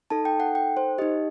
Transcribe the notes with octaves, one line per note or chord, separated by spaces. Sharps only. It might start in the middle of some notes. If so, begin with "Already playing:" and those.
D#4 A4 A5
G5
F#5
G5
C5
D#4 G4 D#5